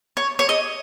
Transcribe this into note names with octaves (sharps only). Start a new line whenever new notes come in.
C#5
C#5
D#5